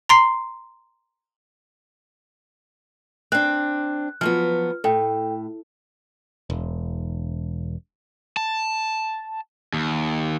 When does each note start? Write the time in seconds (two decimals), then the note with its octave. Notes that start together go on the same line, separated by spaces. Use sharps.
0.09 A#5 C6 C7
3.32 C4 D4 F#6
4.21 F3 F#3 B3 F6
4.84 A2 A4 G5
6.50 E1
8.37 A5
9.74 D#2